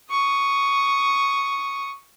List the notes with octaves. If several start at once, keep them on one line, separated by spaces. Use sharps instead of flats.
C#6 D#6